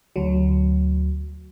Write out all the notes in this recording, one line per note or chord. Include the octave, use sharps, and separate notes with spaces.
D2 F#3